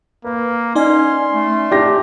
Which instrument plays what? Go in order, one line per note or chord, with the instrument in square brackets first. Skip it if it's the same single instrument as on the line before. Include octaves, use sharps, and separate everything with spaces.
[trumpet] A#3 [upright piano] B4
[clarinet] C#4 [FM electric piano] D#4 D5 G#5 [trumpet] C6
[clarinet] A3
[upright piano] D4 G4 A#6